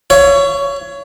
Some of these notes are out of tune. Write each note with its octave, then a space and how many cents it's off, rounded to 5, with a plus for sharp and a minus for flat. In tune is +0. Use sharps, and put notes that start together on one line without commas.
C#5 +15 E5 +45